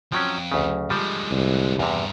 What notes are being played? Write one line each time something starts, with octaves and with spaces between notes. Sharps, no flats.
F2 F3 F#3 C#4 G5
D2 C#3
D3 F3 G3 G#3
C2
E2 G2 C3 A#4